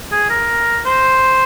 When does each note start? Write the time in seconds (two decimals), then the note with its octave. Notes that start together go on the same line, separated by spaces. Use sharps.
0.11 G#4
0.30 A#4
0.86 C5